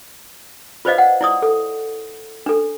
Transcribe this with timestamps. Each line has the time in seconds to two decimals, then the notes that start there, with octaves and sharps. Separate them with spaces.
0.85 F4 B4 C5 D5 D#5 F5
0.98 F#5
1.21 E4 D5 D#6
1.42 A4
2.46 D4 A4